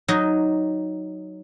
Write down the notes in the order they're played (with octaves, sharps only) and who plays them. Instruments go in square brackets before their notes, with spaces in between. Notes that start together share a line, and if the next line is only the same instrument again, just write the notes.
[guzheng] F#3 D#4 D#5